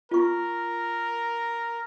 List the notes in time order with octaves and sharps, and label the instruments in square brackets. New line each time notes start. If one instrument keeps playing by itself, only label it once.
[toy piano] F4 C#6 [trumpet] A#4